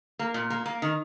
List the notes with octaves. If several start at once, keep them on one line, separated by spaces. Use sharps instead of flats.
A#3
A#2
A#3
A#3
D#3